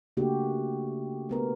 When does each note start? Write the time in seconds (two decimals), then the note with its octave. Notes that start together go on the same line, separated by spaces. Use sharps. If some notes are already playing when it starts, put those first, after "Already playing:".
0.17 C#3 A3 A#3 D4 F#4 G4
1.29 A3 B3 A#4